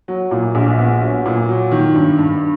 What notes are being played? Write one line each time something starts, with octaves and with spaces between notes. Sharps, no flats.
F#3
A#2
A#1
B3
F#3
A#2
F#3
D#3
G2
G2